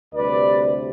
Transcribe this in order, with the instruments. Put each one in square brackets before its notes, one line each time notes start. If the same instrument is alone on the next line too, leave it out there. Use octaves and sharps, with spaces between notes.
[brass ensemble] D2 C3 G3 B4 D5